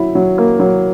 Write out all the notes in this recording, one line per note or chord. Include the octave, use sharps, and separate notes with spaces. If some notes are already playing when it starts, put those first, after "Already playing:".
Already playing: F#3 E4
F#3
A#3
F#3